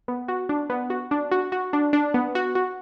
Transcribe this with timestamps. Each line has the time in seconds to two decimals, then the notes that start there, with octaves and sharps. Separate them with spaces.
0.08 B3
0.28 F#4
0.49 D4
0.70 B3
0.90 F#4
1.11 D4
1.31 F#4
1.52 F#4
1.73 D4
1.93 D4
2.14 B3
2.35 F#4
2.55 F#4